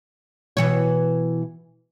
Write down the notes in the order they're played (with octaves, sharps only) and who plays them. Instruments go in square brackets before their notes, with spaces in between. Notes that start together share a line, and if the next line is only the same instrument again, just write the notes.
[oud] B2 E3 C#5